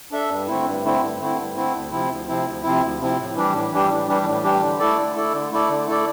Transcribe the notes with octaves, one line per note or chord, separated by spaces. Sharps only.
D4 A4 E5
G2
D3 A3 C4 E4
G2
D3 A3 C4 E4
G2
D3 A3 C4 E4
G2
D3 A3 C4 E4
D2
C3 F3 C4 E4
D2
C3 F3 C4 E4
D2
C3 F3 C4 E4
D2
C3 F3 C4 E4
A2
E3 G3 D4 G4
A2
E3 G3 D4 G4
A2
E3 G3 D4 G4
A2
E3 G3 D4 G4
D3
A3 E4 A4 D5
D3
A3 E4 A4 D5
D3
A3 E4 A4 D5
D3
A3 E4 A4 D5